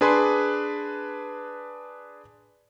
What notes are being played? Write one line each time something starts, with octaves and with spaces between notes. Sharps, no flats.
D4 G#4 B4 G#5 B5 C6